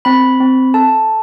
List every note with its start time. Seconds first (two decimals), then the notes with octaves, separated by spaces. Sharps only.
0.05 C4 B5
0.40 C4
0.74 A4 A5